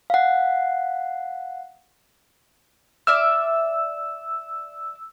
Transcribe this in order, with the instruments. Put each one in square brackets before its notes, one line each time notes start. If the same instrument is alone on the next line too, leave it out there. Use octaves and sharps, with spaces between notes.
[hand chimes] F5 F#5
[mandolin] D5 E5 F6 [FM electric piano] E6